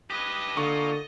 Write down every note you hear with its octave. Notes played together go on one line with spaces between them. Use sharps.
G4 B4 D#5 D#6
D3 A#3 F4 C#6